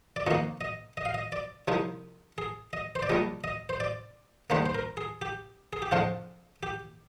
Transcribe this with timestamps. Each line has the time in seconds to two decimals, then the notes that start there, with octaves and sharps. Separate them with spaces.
0.16 D5
0.27 F2 D#3 A#3 D#5
0.61 D#5
0.97 D#5
1.05 F5
1.14 D#5
1.32 D5
1.68 C2 C3 F3 D#4
2.38 G#4
2.73 D#5
2.95 C5
3.03 D5
3.10 A#1 A#2 G3 D#5
3.44 D#5
3.69 C5
3.80 D5
4.50 D#2 D3 G3 A#3 C5
4.66 C5
4.75 A#4
4.97 G#4
5.22 G4
5.73 G#4
5.82 G4
5.91 F2 D3 F3 G#3 C4 F4
6.63 G4